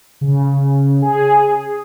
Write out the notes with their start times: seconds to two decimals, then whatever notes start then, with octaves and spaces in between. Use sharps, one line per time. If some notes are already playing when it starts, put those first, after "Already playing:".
0.21 C#3
1.02 G#4